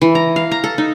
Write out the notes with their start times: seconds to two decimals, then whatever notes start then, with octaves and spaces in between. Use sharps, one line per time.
0.02 E3
0.15 A#5
0.36 F5
0.52 A#5
0.64 A4
0.78 D#4